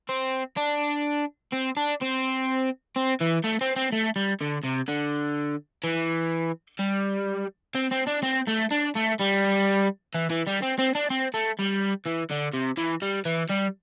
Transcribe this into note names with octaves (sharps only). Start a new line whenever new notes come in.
C4
D4
C4
D4
C4
C4
E3
A3
C4
C4
A3
G3
D3
C3
D3
E3
G3
C4
C4
D4
C4
A3
D4
A3
G3
E3
E3
G3
C4
C4
D4
C4
A3
G3
E3
D3
C3
E3
G3
E3
G3